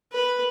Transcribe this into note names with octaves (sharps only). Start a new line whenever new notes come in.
B4